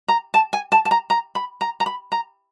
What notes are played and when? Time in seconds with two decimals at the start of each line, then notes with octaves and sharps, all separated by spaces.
0.08 A#5
0.34 A5
0.53 G#5
0.72 A5
0.85 A5
0.91 A#5
1.10 A#5
1.35 B5
1.61 A#5
1.80 A#5
1.86 B5
2.12 A#5